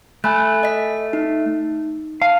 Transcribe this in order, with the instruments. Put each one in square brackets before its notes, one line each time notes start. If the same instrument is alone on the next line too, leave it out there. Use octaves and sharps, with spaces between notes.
[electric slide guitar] A3 [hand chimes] G#5 B5 F#6
[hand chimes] D#5 B6
D#4
[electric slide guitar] F5 [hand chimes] A5